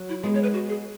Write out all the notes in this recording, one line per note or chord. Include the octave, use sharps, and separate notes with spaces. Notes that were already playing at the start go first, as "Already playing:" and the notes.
Already playing: F#3
E4
G#3 B3 G#4
C#5
B4
F#4
G#4